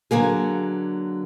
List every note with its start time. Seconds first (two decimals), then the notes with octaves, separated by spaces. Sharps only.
0.11 D3 F#3 A#3 G#4